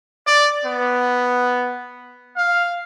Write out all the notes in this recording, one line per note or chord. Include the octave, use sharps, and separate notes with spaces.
D5
B3
F5